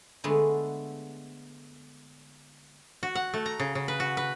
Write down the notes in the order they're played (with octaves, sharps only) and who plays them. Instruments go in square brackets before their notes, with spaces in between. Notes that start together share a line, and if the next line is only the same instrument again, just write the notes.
[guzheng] D3 G#3 A3 B3 D4
[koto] F#4
F#5
A3
A#5
C#3
C#3
B4
F#4
B4